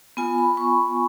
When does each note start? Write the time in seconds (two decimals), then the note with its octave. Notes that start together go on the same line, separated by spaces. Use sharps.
0.17 B3 F4 G#5
0.38 B5
0.57 C#6